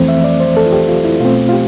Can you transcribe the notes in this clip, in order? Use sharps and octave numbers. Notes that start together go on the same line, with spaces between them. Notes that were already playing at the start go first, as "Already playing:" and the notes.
Already playing: F2 E3 A3 C4
E5
D5
C5
A4
F4
G4
F4
E4
B2 A3 C4 F4
F4
G4